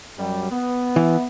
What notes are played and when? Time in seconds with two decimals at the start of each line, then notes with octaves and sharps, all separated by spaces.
0.18 F#2 F#3 G3
0.50 B3
0.96 E3